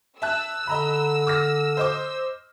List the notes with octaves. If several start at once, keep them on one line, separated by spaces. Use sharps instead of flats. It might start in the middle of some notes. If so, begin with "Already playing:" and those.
E5 A5 E6 F#6
D3 D#5 A#5 B5
D6 F6 A#6
C5 D#5 D6